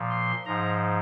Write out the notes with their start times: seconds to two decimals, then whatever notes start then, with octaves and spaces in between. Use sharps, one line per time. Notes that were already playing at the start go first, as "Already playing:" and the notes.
Already playing: A#2 F3
0.10 C6
0.46 G#2 F3 A#5